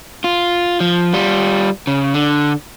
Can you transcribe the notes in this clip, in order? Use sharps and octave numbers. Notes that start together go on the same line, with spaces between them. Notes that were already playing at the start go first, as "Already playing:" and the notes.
F4
F3
G3 F4
C#3
D3